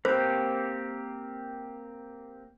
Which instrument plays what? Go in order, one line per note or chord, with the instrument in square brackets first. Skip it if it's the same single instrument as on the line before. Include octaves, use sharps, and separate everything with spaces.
[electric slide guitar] A#3 C4 G4 [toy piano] C5